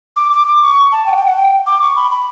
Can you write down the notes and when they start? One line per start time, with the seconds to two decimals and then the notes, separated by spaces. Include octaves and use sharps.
0.16 D6
0.32 D6
0.47 D6
0.62 C#6
0.92 A5
1.06 G5
1.12 F#5
1.16 G5
1.26 F#5
1.36 G5
1.67 D6
1.81 C#6
1.96 B5
2.11 B5